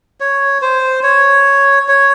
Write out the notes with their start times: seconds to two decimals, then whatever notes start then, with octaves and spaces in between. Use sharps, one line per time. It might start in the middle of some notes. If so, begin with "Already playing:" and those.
0.20 C#5
0.62 C5
1.03 C#5
1.88 C#5